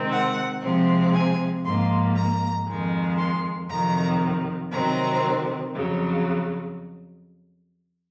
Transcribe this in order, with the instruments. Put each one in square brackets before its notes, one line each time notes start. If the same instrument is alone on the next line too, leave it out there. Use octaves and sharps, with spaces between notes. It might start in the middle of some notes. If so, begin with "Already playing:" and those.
Already playing: [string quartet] C3 D#3 G#3 C4
F#5
C3 F3 G#3 C4
G#5
G#2 F3 A#3 C6
A#5
F2 D#3 G#3
C6
F2 C3 D#3 F#3 A#5
C3 D#3 F#3 C4 A#5
F2 C#3 F#3